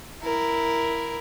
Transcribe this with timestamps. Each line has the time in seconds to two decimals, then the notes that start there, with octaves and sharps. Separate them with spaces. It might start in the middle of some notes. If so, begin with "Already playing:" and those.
0.22 E4 A#4